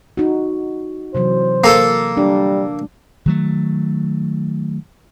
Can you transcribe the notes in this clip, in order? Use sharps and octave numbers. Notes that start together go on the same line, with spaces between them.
D#4 F#4
C3 E3 F#3 C5
A#3 A4
G3 D4
D#3 F#3 A3